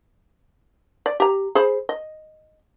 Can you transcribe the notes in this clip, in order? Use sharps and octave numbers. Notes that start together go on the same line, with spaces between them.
D5
G4 A#5
G#4 C5 B5
D#5